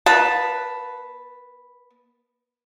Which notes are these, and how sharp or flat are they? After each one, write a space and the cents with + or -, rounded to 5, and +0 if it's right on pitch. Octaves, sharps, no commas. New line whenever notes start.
A#3 +35 B4 +0 A5 +0